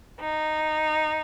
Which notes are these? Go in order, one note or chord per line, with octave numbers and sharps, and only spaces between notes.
D#4